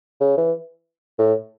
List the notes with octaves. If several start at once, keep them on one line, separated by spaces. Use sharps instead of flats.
C#3
E3
A2